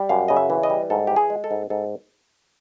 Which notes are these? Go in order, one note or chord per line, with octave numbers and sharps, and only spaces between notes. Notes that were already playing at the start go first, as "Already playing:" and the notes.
Already playing: G3
F#2 F5
C#3 D#5
E5
E3
D#5
G3
G#2 A4
E3 G4
G#4
G#3
A4
G#2
G#2 A4